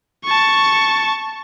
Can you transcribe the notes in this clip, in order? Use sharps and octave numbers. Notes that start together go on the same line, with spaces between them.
A5 C#6